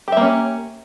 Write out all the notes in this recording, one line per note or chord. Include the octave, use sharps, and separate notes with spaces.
A#3 C#4 G4 E5